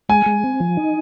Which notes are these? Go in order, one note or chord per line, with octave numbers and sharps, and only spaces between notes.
G#3 G#5
G#3
C4
F3
D#4